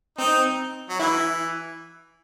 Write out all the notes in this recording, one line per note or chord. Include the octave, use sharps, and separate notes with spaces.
C4 D#4
F#3
E3 E4